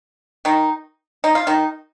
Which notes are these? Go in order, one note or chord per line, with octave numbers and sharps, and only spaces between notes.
D#3 D#4
D#4
F4
D#3 D#4